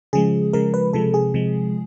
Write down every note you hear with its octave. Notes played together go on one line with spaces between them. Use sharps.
C#3 F3 G#3 G#4
C#3 F3 G#3 A#4
B4
C3 F3 G#3 A4
G#4
C3 F3 G#3